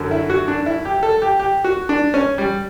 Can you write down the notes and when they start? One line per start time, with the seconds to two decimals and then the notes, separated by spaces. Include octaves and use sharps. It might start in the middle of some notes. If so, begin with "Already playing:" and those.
Already playing: F#2 D3 F#3
0.11 E4
0.30 F#4
0.48 D4
0.66 E4
0.85 G4
1.03 A4
1.22 G4
1.39 G4
1.64 F#4
1.89 D4
2.14 C#4
2.38 G3